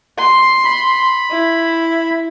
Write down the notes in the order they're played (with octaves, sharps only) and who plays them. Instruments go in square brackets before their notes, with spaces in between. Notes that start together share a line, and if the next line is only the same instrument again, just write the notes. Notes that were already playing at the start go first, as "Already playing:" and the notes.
[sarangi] C6
[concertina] B5
[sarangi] E4